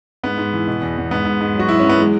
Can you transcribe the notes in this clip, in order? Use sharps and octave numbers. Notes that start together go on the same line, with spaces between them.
G#2 B3
G#2
E3
B2
E2
E2
G#2 B3
G#2
G#2
F#3 F#4
F#3 E4
F#3 C#4
B3
E3 G#3